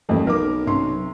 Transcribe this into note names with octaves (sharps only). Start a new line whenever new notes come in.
D#1 F2 A3
B1 A#4 D6
C3 C#4 C6